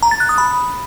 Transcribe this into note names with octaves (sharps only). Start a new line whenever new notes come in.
A#5
A6
F#6
D#6
B5